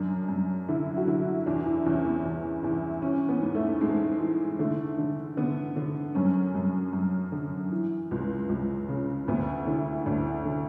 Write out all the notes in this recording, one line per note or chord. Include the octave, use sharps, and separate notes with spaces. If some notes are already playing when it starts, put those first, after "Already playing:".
Already playing: F#2 D4
F#2
D3 E4
F#4
D3 E4
E2 D4
E4
E2 C#4
B3
E2
E2 E4
E3 C#4
B3
G#2
A3
G#2 G#3
E3
D3 A3
D3
D3 B3
D3
F#2 C#4
F#2
F#2
D3
E3
C#2
C#2
C#3
D2 B3
D3 E4
D2 D4
D3